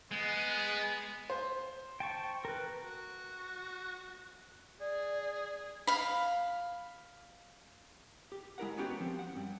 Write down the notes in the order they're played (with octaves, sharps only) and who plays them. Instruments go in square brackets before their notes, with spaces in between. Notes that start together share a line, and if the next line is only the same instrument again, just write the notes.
[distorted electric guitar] G#3 [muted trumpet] B3
[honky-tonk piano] C5
[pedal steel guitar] G5 A5 C#6
A#4 B4
[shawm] F#4
[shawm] G#4 [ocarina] D5
[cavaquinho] F5 B5
[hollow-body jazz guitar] G4
G#3 E4 A#4 F#5
B3 C#4 F#4 G4
F3 C4
F#5
G2